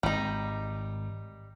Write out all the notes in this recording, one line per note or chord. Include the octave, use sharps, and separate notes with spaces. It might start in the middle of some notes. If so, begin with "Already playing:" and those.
G#1 G3 D#4